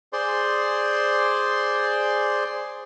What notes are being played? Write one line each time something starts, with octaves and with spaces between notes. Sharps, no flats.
G#4 C5 D5 C6